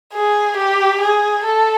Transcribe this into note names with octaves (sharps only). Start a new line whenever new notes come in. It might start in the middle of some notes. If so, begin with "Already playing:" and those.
G#4
G4
G#4
A4